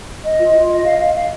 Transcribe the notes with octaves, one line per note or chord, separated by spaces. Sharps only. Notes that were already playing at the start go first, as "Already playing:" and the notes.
D#5
F4
F4
D#5
F5
F5
F5